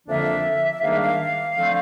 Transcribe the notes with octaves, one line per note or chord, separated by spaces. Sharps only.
F2 D3 F3 A#3 D4 E5
G#2 D#3 G3 A#3 D4 F5
E5
F5
D3 F3 A3 C4